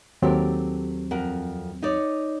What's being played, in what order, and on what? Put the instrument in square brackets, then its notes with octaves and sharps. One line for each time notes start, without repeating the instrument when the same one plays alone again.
[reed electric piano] D#2 F#3 C4 [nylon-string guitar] G4 A4 A#4
[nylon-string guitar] F2 A#4 F#5
D#4 C#5 D5